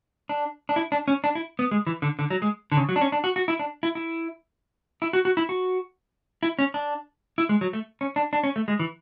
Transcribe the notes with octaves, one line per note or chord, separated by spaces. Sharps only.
D4
D4
E4
D4
C#4
D4
E4
B3
G#3
E3
D3
D3
F#3
G#3
D3
C#3
F#3
D4
C#4
D4
F#4
F#4
E4
D4
E4
E4
E4
F#4
F#4
E4
F#4
E4
C#4
D4
E4
G#3
F#3
A3
C#4
D4
D4
C#4
A3
G#3
E3